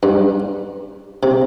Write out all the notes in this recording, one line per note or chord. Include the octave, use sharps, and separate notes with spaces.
G2
C3